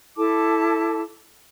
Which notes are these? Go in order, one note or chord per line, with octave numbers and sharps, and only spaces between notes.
E4 A4 A5 D6